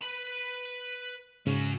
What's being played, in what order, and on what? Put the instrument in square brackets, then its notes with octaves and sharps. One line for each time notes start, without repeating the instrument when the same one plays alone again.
[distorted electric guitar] B4 B5
[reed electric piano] G#2 C#3 [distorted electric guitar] C#4 F#4